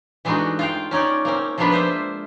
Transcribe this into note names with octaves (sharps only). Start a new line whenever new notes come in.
E3 G#3 A3 D4 D#4 F#4
F4 F5 G5
C#4 D#4 C#5 D5
A#3 C4 C#4
F3 G#3 A#3 B3 D4 B4
F4 C5 E5